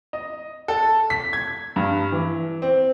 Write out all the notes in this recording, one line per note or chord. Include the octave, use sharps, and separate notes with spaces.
D#5
A4
B6
G#6
G2
E3
C4